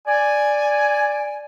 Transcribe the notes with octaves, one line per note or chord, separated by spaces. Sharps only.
D5 G#5